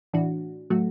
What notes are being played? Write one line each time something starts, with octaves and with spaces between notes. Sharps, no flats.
A2 E3 D4 F#4
A2 F#3 A3 F#4